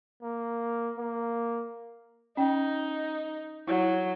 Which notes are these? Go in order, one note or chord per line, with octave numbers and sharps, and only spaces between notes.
A#3
A#3
C#4 D#4 G5
F#3 E4